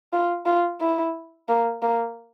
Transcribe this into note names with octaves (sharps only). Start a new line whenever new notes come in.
F4
F4
E4
A#3
A#3